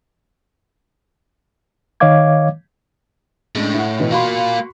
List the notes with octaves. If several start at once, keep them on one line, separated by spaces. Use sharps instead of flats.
D#3 C#5 D#5 F5 D6 G#6
A2 G#3 C#4 D4
E4 F#5
B2 E3
A#3 F4 F#4 B5 C6